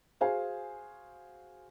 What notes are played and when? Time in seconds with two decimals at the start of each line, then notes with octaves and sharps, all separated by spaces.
0.21 F#4 G#4 C5 F5 G#5